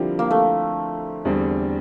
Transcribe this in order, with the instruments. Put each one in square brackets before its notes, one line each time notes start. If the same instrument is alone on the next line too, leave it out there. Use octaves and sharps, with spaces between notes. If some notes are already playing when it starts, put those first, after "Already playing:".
Already playing: [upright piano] D3 F3 C4 E4 A#4 [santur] G3
[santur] A#3
A3
[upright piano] E2 D3 G3 C4